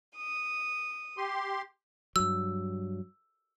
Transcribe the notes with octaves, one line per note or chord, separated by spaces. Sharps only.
D#6
G4 C6
G2 F#3 E6